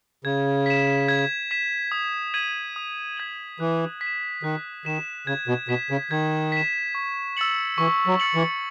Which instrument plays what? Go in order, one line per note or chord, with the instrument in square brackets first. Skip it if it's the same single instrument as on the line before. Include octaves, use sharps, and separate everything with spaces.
[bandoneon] C#3 [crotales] G#6
[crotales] B6 E7
G#6
B6 E7
D#6
G#6 B6 D#7 F#7
D#6
G#6 B6 D#7 F#7
[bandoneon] E3 [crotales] F#6
[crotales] B6
E7
[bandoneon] D#3 [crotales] F#6
[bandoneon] D#3 [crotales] B6 E7
[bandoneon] C#3 [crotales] G#6
[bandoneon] B2
[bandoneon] B2 [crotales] B6 E7
[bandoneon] C#3
[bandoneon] D#3 [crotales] G#6
[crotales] B6 E7
C#6
E6 A6 C#7 F#7
[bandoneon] E3 [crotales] C#6
[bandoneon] F#3
[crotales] E6 A6 C#7 F#7
[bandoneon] E3